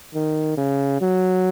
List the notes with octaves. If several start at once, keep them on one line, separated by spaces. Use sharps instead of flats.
D#3
C#3
F#3